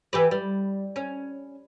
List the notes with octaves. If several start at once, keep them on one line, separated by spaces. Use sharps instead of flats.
E3 G4 B4
G3
C#4